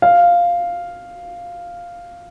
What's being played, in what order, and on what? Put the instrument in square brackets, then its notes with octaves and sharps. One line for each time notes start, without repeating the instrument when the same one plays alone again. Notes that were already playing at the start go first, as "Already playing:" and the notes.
[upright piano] F5